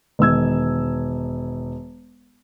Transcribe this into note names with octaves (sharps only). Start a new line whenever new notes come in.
E1 D#3 E6 G#6